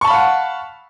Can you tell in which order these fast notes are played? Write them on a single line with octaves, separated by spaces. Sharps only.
C#6 A5 B5 F5 F#5